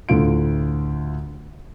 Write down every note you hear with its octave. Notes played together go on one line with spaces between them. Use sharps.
D2 A2 F4 D7